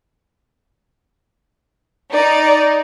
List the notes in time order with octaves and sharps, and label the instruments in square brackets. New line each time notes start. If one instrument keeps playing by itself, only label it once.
[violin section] D#4 [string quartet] D5